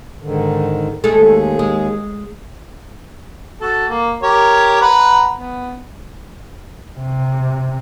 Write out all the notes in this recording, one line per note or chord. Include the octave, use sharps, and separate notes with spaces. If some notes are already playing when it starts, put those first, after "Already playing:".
G#2 D3 D#3
D#2 G#3 A3 G#4 A4
G#3
F#4 A4
A#3
G4 A#4 C#5
B4 F#5 A#5
B3
C3